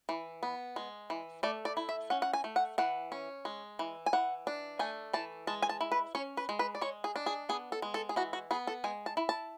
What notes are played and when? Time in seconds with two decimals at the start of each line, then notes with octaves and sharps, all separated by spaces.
0.09 E3
0.43 B3
0.76 G#3
1.10 E3
1.43 A3 D5
1.65 D5
1.77 E4
1.89 E5
2.10 C#4 F#5
2.22 F#5
2.33 G#5
2.44 A3
2.56 F#5
2.78 E3 F#5
3.12 C#4
3.45 G#3
3.79 E3
4.06 G#5
4.13 E3 F#5
4.47 D4
4.79 A3 G#5
5.13 E3 A5
5.47 G#3 A5
5.62 G#5
5.69 A5
5.81 E4
5.92 B4
6.15 C#4 C#5
6.37 B4
6.49 G#3
6.59 B4
6.75 D5
6.81 G#3 C#5
7.04 G#4
7.16 D4
7.26 G#4
7.49 B3 G#4
7.72 A4
7.82 G#3
7.94 A4
8.09 G#4
8.16 E3 F#4
8.33 F#4
8.51 B3 G#4
8.67 A4
8.84 G#3 G#5
9.06 A5
9.17 E4
9.29 A5